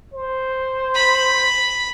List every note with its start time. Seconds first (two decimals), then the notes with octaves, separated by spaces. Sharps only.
0.14 C5
0.95 B5